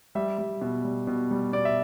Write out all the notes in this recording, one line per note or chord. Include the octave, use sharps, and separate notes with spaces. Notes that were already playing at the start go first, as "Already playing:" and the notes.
G3 E5
G3
B2
G3
B2
G3
B2 D5
E5